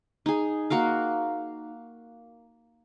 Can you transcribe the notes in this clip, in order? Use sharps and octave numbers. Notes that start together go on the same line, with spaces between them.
D#4 G#4
A#3 F#4 A#4 F5